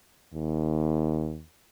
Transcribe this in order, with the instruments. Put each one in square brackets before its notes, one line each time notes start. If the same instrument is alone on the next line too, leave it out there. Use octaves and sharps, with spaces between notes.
[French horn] D#2